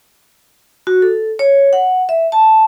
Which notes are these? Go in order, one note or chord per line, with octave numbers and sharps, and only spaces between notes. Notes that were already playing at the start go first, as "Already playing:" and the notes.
F#4
A4
C#5
F#5
E5
A5